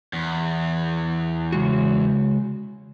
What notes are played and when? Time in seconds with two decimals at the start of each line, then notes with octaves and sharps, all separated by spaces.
0.13 E2
1.52 C#3 G#3 F#4